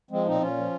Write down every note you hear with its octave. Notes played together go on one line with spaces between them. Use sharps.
F3 G#3 C4
A#2 C4 D#4
A#2 C#4 F4
F3